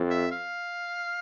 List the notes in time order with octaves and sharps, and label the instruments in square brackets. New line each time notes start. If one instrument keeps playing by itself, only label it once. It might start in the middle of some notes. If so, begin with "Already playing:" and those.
Already playing: [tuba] F2
[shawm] E5
F5